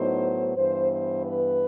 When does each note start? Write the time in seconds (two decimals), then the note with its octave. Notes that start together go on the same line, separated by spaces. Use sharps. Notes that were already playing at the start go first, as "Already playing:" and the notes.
Already playing: A2 F#3 B3 D#4 C5
0.56 G2 E3 B3 C5
0.92 C5
1.26 B4